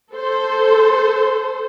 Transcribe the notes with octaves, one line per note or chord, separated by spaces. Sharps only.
A4 C5